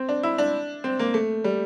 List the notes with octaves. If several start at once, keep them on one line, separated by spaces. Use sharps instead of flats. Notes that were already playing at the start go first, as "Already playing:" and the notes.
Already playing: C4
D4
E4
D4
C4
A#3
A3
G3